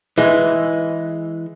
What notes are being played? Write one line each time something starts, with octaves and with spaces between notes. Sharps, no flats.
E3 G#3